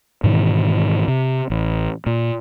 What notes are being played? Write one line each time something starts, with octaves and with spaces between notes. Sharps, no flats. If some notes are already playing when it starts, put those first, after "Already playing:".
G#2 B2 D#3 E3
C3
A1
A#2